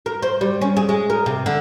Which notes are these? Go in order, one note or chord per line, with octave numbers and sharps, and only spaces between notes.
A#4
C5
G3
C#4
G#4
G#3
A#4
C3
D3